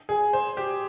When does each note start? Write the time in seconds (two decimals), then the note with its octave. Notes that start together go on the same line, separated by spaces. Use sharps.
0.09 G#4
0.33 C5
0.57 G4